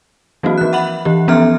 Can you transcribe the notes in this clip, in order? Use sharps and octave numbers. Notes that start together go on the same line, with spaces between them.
E3 F#3 A#3 C4 F#4
F3 F#6
E5 F#5 B5 F#7
E3 G4
F3 B3 C#4 A4 E5 F6